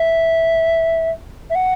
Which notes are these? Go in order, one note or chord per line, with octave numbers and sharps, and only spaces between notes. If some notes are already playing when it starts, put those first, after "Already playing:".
Already playing: E5
E5
F#5